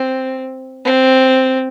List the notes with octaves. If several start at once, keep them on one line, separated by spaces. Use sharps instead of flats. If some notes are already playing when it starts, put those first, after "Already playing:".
Already playing: C4
C4